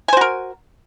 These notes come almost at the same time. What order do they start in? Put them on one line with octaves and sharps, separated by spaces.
G#5 C5 F#4 A#4